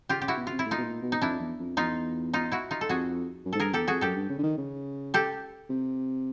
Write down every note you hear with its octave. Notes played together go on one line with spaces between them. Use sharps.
C#3 F4 G4
C#3 G4
E4 F#4
B2
C#3 F4
C3
E4
A2
D#4 F4
B2
A#2
B2
D#4
F2 D4 E4
E2
F2
E2 D#4 F4
D#4 F4
E4 F#4
D#4 F4
A4
F2 F#4 G#4
F#2
G#2 A4
G2 G#4 A#4
E2 G4 A4
F2 F#4 G#4
F#2 G4 A4
G2
C#3
D3
D#3
C#3
G4 A4
C3